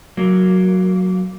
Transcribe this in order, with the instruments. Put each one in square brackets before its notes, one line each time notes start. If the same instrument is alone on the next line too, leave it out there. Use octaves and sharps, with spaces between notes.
[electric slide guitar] F#3 A#3